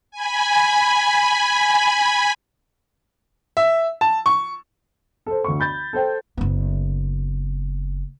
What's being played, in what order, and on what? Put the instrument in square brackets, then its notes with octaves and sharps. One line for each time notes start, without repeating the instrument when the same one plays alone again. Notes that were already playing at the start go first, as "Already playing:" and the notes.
[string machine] G#5 B5
[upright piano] E5
A5
C#6
A4 C5
D2 C#6
B5 G6 A6
A4 C5 G5
[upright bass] F#1 B3